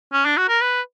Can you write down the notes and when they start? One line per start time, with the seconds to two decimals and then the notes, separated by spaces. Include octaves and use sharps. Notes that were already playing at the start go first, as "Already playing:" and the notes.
0.13 C#4
0.25 D4
0.37 F#4
0.49 A#4
0.61 B4